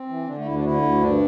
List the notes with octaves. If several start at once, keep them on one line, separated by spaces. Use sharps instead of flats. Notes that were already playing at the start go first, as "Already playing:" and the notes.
Already playing: C4
E3
D3 D4
A3
D2 E4
D4
D3 E4
D2
G2 D4